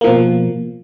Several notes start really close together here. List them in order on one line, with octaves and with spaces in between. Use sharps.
A#3 F3 B2